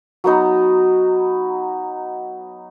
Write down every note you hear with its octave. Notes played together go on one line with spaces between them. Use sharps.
F#3 B3 D#4